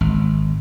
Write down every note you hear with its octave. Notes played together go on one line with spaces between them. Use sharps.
G#1